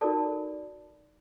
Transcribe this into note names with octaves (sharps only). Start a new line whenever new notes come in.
D#4 F#4 A4 A#4 D5 A5